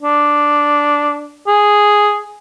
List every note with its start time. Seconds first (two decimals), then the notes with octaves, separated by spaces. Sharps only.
0.02 D4
1.48 G#4